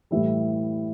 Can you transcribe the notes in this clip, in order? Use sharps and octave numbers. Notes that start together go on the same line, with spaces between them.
A2 E3 G3 E5